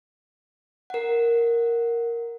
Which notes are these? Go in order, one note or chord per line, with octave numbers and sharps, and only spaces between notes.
A#4 F#5